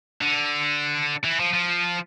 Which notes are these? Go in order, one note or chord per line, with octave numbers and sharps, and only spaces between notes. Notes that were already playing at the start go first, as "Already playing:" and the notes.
D3
E3
F3
F3